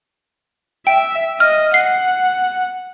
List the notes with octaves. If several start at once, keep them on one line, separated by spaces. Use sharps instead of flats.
E5 G5
D#5 F6
F#5 C7